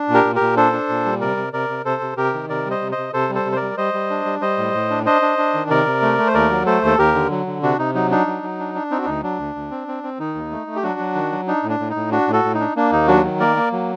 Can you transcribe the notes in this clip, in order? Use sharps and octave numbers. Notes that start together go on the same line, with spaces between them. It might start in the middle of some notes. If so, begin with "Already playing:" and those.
Already playing: D4
A#2
G4 A#4
A#2
G4 A#4
A#2
D4 A4 C5
D4
A#2
G3
C3 A#4 D5
C3
C3 A#4 D5
C3
C3 A4 C5
C3
C3 G4 A#4
D#3
C3 A#4 D5
G3
C5 D#5
C3
C5 D#5
C3
C3 A4 C5
G3
A4 C5
C3
C5
A#4 D5
G3
G3 C5 D#5
G3
D4
G3
G3 C5 D#5
A2
A2
D4
D4 C5 D#5
D4
D4
D#3
C3 A#4 D5
C3
A3
A3
C5
D#2 A#4 D5
F#3
A3 A4 C5
D#2 A4
D#2 G4 A#4
D3
F#3
D3
C3 D4 F#4
C3 D#4
F#3 D#4
D4 D#4
F#3
F#3
D4
D4
C4 D#4
F#4
D2 D#4
F#3 D4
D2
D2
C4
C4
C4
D#3 D#4
D#2
A3
A3
G4
F#3 D4 F#4
F#3
D#3
F#3
D4 D#4
A2
D4
A2
D#4
A2
D4 F#4
A2
F#4 A4
A2
D#4
D4
A#3 D4
D#2 D#4
F#3 D4 F#4
D#3
A#3 A#4 D5
A#3
F#3